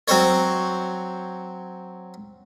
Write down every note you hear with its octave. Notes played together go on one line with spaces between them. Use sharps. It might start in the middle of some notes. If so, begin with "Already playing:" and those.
F#3 C4 C5 C#5